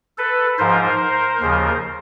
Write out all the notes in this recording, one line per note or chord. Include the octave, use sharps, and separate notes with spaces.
A4 B4
G#2 F3 A#4 C5
D#2 C#3 F3